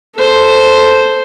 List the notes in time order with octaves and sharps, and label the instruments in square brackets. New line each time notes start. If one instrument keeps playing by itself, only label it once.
[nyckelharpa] A4 C5